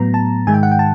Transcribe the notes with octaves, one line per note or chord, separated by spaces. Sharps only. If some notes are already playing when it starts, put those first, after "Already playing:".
Already playing: A2 F#3 B3 A#5
A5
G#2 D#3 G#3 G#5
G5
F#5
G5
A5